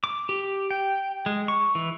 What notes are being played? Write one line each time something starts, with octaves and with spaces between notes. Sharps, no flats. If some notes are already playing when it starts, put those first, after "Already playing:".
D6
G4
G5
G#3
C#6
E3